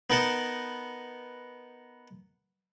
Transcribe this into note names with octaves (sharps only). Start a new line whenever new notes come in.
B3 D#4 A#4 F#5 A5